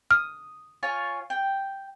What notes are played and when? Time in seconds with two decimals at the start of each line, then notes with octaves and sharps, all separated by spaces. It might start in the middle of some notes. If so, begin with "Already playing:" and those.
0.11 D#6 F6
0.83 F4 C#5 G#5
1.30 G5